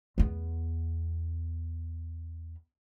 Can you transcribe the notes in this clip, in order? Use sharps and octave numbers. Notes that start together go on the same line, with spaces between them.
E2 B3